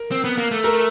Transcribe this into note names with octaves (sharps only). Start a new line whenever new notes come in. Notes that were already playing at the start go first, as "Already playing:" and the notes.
Already playing: A#4
C4
B3
A#3
A3
A#4